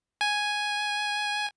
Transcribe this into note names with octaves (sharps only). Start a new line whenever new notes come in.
G#5